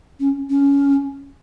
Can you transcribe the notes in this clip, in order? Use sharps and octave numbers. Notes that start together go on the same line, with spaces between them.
C#4
C#4